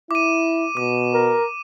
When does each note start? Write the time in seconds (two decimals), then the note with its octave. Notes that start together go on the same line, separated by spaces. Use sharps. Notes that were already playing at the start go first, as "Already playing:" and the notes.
0.11 E4 D6 D#7
0.77 B2 D6
1.14 A#4